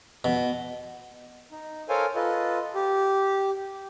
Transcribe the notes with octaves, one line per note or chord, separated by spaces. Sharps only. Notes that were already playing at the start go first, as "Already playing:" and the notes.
B2
D#4
A4 A#4 C5 C#5 F5 G#5
F4 A4 B4 D#5
G4